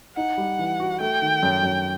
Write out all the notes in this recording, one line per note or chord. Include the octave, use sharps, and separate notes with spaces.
D#4 F#5
G3
E3
F#4
A3 G5
D#3
F#2
F#2